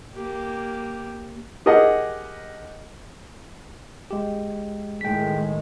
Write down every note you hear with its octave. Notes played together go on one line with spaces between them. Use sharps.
A#3 G4
G4 G#4 A#4 D#5 F#5
G#3 G4
A2 D#3 G#3 G5 B6